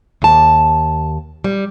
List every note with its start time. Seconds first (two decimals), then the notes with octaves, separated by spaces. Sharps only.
0.22 D#2 A5
1.44 G3